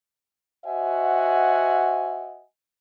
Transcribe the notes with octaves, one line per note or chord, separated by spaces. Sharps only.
F#4 C5 D#5 E5 F#5 G#5